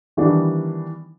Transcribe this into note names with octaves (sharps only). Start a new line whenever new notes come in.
D#3 E3 G3 B3 D4